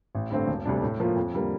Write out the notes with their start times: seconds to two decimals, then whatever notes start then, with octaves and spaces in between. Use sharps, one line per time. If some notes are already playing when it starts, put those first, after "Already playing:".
0.15 A1
0.30 G2 D3 A3 C4
0.48 E1
0.65 D2 C3 G3 D4
0.82 A2
1.00 F3 A#3 F4
1.16 F2
1.33 D3 G3 A#3